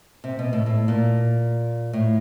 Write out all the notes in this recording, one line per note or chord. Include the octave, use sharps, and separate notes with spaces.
C3
B2
A2
A2
A#2
A2